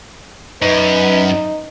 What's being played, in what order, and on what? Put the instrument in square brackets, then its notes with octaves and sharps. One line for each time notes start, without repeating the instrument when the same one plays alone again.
[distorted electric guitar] F#2 [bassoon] D#4 [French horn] B4